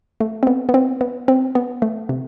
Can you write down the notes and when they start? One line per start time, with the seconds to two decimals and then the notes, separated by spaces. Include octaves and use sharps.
0.20 A3
0.43 C4
0.47 B3
0.69 B3
0.74 C4
1.01 B3
1.28 C4
1.55 B3
1.82 A3
2.09 C3